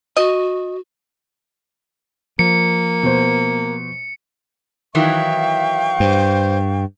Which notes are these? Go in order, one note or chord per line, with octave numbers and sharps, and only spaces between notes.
F#4 D#5
F3 A#3 C#7
B2 C5
D#3 E3 F#3 E5 F5 G5 C#6
G2 C5